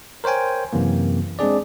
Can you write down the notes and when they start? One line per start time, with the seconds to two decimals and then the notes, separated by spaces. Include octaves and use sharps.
0.24 A#4 C5 C#5 G5 G#5
0.73 F#2 C3 E3 A#3
1.39 G#3 C4 D4 G#4 D5